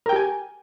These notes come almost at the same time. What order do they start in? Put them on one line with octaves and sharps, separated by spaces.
A#4 G5 G4 G#5